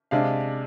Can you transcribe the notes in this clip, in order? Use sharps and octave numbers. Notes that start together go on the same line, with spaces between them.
C3 G#3 D4 F5